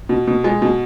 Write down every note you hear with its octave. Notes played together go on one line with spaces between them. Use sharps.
B2
B2
G#3
B2